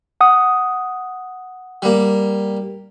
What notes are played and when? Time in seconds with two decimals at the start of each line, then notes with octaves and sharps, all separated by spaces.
0.21 F#5 D#6
1.82 G3 A#3